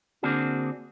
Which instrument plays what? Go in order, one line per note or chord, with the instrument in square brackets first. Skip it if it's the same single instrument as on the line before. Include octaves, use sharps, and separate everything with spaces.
[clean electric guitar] D3 A#3 C4 D4 F#4 G#4